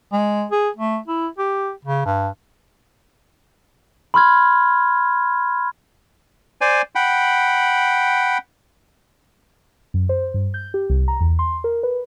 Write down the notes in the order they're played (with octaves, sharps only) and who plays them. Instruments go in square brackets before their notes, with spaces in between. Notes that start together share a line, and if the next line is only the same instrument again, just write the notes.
[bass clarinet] G#3
G#4
A3
E4
G4
C#3
G2
[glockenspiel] B5 C6 F6 G#6
[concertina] C5 D5 G#5
F#5 G5 B5
[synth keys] F#2
C5
G2
G6
G4
C2
A#5
E2
C6
A#4
B4